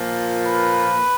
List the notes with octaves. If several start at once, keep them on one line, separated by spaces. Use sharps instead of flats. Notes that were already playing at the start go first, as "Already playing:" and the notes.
Already playing: A#2 F3 A#3
B4